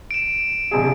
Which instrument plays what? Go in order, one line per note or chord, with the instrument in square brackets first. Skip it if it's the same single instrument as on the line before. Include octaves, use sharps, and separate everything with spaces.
[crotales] D7 E7
[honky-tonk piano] A#1 C3 G#4